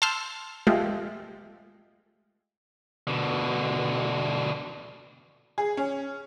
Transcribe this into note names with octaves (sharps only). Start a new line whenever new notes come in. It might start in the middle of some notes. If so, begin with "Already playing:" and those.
A5 C6 E6 F6 G6
G#3 A3 F4 G4
B2 D3
G#4
C#4